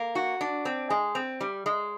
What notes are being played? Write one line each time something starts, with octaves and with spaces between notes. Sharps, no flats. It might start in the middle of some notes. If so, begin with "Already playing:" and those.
Already playing: A#3
F#4
D4
C4
G#3
C4
G3
G#3